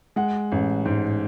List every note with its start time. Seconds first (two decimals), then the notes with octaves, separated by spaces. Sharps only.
0.16 G#3 F#5
0.52 A1
0.85 G#2